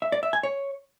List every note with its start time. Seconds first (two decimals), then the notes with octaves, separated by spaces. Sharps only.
0.02 E5
0.12 D5
0.23 E5
0.33 G#5
0.43 C#5